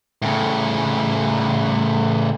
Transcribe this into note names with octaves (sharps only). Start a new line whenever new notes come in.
A2 C#3